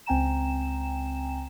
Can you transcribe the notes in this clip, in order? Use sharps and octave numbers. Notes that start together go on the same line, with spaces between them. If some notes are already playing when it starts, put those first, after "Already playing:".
C#2 C4 G5 G#5 A#5 E7